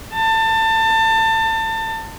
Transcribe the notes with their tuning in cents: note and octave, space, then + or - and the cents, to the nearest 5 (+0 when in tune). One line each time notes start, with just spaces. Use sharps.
A5 +25